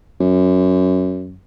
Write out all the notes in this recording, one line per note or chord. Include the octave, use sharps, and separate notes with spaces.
F#2